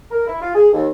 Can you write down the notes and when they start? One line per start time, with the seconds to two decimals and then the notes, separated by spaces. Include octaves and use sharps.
0.11 A#4
0.27 E4
0.41 F4
0.55 G#4
0.73 D#2